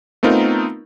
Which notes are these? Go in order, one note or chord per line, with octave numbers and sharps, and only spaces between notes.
A3 B3 C4 D#4 F4 A#4